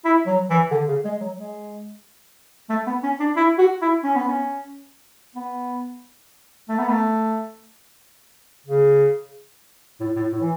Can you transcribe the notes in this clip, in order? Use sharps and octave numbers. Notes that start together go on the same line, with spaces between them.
E4
F#3
E3
D3
C#3
G#3
F#3
G#3
A3
B3
C#4
D4
E4
F#4
E4
C#4
B3
C#4
B3
A3
B3
A3
C#3
A2
A2
A2
E3